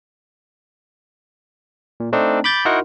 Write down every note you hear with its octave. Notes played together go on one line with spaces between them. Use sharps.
A#2
A3 C4 D4 D#4
B5 D6 G6 A6
D#4 E4 F#4 A#4 F#5 C6